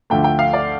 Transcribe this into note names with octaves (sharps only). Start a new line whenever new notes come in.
D2 D3 F3 A3 G5
G5
F5
D5